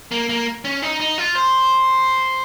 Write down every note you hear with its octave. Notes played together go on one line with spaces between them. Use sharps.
A#3
A#3
C#4
D#4
D#4
F4
C5